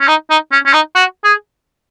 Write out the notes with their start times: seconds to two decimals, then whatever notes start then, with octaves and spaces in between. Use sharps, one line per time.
0.01 C#4
0.08 D#4
0.30 D#4
0.52 C#4
0.66 C#4
0.74 D#4
0.95 F#4
1.24 G#4